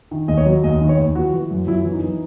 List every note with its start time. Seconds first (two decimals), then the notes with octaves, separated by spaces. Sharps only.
0.11 D#3
0.28 D#2 D#5
0.37 C#5
0.46 F#3
0.64 D#2 D#5
0.81 D#3
0.89 C#5
0.98 D#2
1.15 E3 F#4
1.33 E3
1.51 F#2
1.67 F#2 E4
1.85 E3
1.93 D#4
2.02 E3